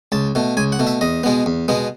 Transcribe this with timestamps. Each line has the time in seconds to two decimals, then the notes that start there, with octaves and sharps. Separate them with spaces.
0.12 C#2 A5
0.35 B2 A3
0.57 C#2 G#5
0.72 F#5
0.79 B2 A3
0.87 E5
1.01 E2 D#5
1.23 B2 G#3 B3
1.46 E2
1.68 B2 G#3 B3